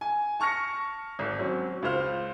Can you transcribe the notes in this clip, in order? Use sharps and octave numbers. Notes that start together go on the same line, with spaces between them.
G#5
A5 C#6 F6 A#6 C#7
G#1
F#3 C4 C#4
C#2 F4 C5 F6